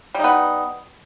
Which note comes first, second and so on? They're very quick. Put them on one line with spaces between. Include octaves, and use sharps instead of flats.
G3 D#4 B3